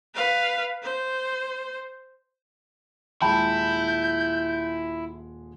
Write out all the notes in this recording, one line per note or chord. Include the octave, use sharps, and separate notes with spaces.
B4 F5
C5
D#1 G#3 E4 G5 A5 B5 G6